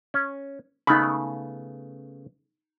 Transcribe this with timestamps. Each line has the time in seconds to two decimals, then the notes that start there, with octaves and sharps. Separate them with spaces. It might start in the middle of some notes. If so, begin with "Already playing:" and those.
0.14 C#4
0.87 C#3 A3 B3 D#4 B5